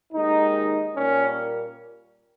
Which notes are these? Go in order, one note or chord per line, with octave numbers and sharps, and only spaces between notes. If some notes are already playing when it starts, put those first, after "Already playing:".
D#2 D#3 G#3 D#4
A#2 G3 A#3 C#4